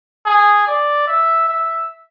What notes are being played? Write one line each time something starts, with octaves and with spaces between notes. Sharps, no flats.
G#4
D5
E5
E5